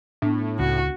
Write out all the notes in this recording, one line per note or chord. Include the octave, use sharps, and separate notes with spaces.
A2 B3 D4
C#2 F#4